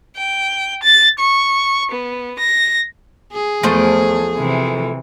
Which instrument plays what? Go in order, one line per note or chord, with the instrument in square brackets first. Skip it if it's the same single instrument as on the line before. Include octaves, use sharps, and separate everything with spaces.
[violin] G5
A6
C#6
B3
A#6
[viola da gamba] G#4
[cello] E2 [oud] F3 A3 C5
[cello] C3 E3